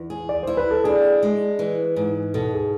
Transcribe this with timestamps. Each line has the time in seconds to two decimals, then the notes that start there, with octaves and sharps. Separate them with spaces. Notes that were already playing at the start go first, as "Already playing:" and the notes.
Already playing: E2
0.10 G#4
0.29 D5
0.43 E4 C5
0.57 B4
0.71 A4
0.84 D4 G#4
1.23 G#3
1.59 E3
1.96 G#2
2.34 B2 A4
2.53 G#4